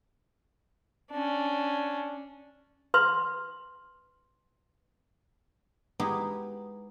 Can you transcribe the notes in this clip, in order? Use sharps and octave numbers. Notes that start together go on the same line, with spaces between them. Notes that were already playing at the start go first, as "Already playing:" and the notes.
C#4 D4
B4 C6
G#3 B3 D#4 E4 G4